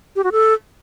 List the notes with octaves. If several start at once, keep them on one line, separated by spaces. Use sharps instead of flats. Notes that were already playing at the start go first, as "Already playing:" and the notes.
G4
F#4
A4